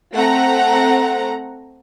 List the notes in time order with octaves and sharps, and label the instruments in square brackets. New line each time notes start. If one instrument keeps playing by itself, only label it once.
[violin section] A3 C4 F#5 A#5